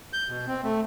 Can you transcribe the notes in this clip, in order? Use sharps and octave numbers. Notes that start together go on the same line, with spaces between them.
G6
B2
C4
A3